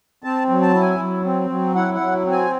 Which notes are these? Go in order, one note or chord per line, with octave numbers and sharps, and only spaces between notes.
C4 A5
F#3
A5
E4
G#5
F#3
C4
F#3
E4 F#5
F#5
F#3
C4
G#5